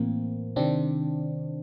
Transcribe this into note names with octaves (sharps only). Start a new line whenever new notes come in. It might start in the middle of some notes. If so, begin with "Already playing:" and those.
Already playing: A2 E3 A#3 C4
C3 D#3 C4 D4